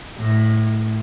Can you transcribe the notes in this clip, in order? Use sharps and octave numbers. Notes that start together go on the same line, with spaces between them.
A2